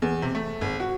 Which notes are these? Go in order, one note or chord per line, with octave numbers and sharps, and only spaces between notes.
E2
C3
A3
G#1
F#4